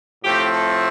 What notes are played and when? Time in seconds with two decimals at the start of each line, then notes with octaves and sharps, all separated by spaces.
0.24 A2 F3 A3 C4 G4
0.53 A4